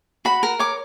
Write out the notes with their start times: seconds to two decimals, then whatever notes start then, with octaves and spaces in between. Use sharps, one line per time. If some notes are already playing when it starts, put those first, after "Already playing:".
0.25 F#4 B5
0.43 A#4
0.59 C#5 D6